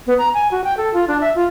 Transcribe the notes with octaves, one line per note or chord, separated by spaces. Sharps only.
B3
A#5
G#5
F#4
G5
A4
F4
D4
E5
F4